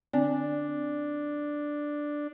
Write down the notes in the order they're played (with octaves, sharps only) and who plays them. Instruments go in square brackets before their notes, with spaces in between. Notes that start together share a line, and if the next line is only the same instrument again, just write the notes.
[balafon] D3 C4 D5 [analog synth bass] D4